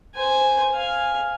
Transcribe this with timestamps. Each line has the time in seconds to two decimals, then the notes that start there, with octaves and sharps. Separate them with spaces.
0.15 C5 G#5
0.74 F5 G#5